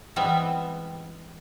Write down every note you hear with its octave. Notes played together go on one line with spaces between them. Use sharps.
E3 G3 G#3 B3 C4 E5